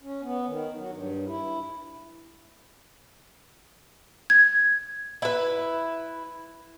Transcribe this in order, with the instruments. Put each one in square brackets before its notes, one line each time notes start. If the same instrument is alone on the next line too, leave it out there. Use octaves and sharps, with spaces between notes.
[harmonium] C#4
B3
D#3
F#3
G2
E4
[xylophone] G#6
[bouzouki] E4 B4